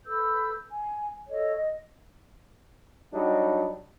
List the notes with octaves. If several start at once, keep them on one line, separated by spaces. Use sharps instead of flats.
A4 B4 E6 G6
G#5
A4 C#5 D#5
D#5
F#3 G3 D4 D#4